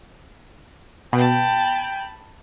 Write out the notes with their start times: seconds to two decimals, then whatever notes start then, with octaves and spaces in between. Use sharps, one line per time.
1.13 B2 G5 A5 B5